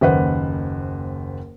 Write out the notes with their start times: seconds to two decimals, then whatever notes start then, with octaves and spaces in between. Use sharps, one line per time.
0.01 F#1 D#2 B4 C5 F#5